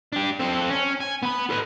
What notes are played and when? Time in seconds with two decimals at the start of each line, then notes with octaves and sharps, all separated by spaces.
0.12 D4 G4
0.39 C4 A4
0.70 C#4
1.00 G#5
1.23 B3 B5
1.50 A4 B4